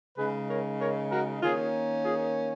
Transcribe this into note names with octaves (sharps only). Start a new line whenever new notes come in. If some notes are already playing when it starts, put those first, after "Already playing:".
C#3 G#3 D#4 G#4 B4
A#4 C#5
A#4 C#5
F#4 A#4
D#3 A#3 C#4 F4 G#4
F4 G#4